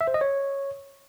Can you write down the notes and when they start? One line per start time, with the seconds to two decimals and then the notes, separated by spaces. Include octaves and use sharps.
0.01 E5
0.07 C5
0.14 D#5
0.21 C#5